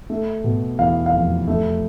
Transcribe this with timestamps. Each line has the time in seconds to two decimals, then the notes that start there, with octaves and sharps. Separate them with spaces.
0.10 A3
0.44 B2
0.79 E2 F5
1.06 F5
1.12 F1
1.48 A3